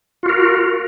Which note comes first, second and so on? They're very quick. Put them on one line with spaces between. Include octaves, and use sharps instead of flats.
F4 F#4 A#4